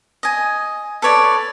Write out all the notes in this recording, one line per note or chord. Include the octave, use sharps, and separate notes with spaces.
D#5 G#5
A4 B4 C#5 D5